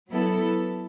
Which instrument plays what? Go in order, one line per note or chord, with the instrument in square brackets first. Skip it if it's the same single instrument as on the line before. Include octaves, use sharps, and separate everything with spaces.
[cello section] F#3 B3 E4 A4